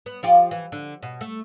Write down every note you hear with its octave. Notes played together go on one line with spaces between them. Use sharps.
B3
F3 F4 G4
E3
D3
B2
A3